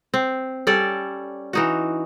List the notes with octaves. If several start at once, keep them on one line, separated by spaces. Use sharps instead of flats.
C4
G3 C#4 A4 D5
E3 D#4 F#4